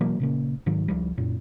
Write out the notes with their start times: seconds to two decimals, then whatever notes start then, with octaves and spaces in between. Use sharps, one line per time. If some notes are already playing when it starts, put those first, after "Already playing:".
0.01 B2 E3 F#3 A#3
0.20 A#2 C#3 A#3
0.66 G#2 D#3 F#3
0.88 C#2 F3 G3
1.18 F#2 A#2